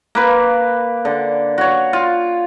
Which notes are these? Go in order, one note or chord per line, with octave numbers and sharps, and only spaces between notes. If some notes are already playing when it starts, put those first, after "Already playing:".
A#3 B4
D3
F#4 C#5
F4